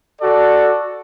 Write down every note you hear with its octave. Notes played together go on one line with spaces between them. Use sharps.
F#4 A4 D5